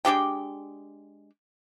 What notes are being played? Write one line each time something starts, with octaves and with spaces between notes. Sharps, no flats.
G#3 D4 G4 G5